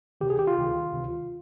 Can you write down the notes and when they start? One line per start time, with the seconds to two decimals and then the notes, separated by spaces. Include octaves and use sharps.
0.21 D2 C3 D#3 G4
0.30 G#4
0.39 G4
0.47 F4
0.57 D2 C3 D#3
0.93 D2 C3 D#3